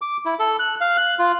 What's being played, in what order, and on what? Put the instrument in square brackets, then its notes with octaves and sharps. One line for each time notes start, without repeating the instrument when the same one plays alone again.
[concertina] D6
E4
A4
F#6
F5
F#6
F4